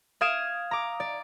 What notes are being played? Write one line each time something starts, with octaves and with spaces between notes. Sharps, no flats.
F5 D#6 G#6 D7 E7
A#5 D6
D5